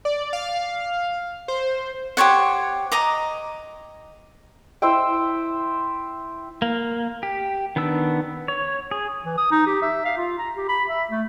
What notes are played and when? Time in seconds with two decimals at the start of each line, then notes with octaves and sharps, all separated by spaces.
0.05 D5
0.33 F5
1.48 C5
2.17 G4 C5 C#5 F#5
2.92 D#5 A#5 D6
4.82 E4 C5 E5 G5
6.62 A#3
7.23 G4
7.76 D#3 B3 D4 E6
8.48 C#5
8.91 G#4
9.25 E3
9.38 D#6
9.52 D#4
9.67 G4
9.82 E5
10.05 F5
10.17 F4
10.39 A#5
10.56 G4
10.69 B5
10.89 E5
11.11 A3